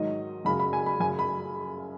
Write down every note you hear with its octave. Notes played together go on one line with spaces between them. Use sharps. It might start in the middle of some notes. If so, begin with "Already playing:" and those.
Already playing: G#2 D#3 F#3 D#5
F#2 C#3 F#3 B5
B5
G#5
B5
F#2 C#3 F#3 G#5
B5